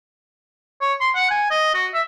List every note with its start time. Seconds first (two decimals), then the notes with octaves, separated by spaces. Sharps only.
0.81 C#5
1.00 C6
1.15 F#5
1.30 G#5
1.51 D#5
1.74 F#4
1.94 E5